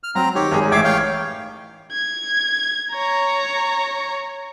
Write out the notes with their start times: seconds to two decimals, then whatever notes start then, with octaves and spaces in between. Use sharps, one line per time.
0.03 F6
0.15 F#3 C4 A#5
0.35 D#3 G4 C#5
0.52 G#1 G#4
0.71 A1 E5 D6 G#6 C7
0.84 C#5 F5 G5
1.92 G#6
2.94 C#5 A#5